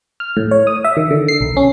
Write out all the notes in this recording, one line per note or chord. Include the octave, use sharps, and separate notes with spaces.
F6
A2
C#5
D#6
E5
D#3
D3
C7
B1
C#4